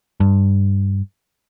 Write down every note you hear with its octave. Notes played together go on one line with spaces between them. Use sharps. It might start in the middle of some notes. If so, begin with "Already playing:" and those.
G2